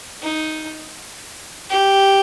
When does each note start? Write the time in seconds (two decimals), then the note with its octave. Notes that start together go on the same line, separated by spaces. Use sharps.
0.22 D#4
1.70 G4